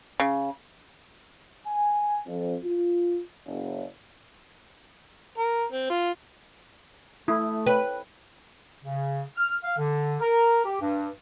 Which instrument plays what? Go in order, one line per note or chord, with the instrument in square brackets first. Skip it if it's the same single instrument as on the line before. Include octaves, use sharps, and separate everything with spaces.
[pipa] C#3
[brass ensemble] G#5
F2
F4
F#1
[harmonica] A#4
C4
F4
[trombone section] A3 [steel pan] E4 [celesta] D#6
[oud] B4 [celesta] C#5 G5
[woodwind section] C#3
F6
F5
D3
A#4
G4
G2